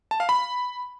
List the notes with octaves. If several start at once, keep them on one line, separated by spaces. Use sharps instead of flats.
A5
F5
B5